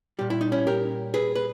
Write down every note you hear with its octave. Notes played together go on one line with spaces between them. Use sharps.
A#2 G3 G4
E4
D#4
C#4 E4
G4 A#4
G#4 B4
B4